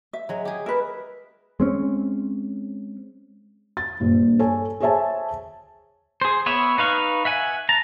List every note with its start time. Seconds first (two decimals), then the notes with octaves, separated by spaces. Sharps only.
0.13 E5
0.29 F#3 G#3
0.45 G4 G#4
0.66 A#4 B4 E5
1.60 G#3 C4 C#4
3.77 A6
4.00 A#1 G2
4.39 A4 C#5 G#5
4.80 G#4 C5 C#5 E5 G#5 A5
6.21 G#4 C5
6.46 B3 B4 C#5 E5
6.78 D#4 B4 F5 C#6
7.25 E5 F#5 G#5
7.69 A5 A#5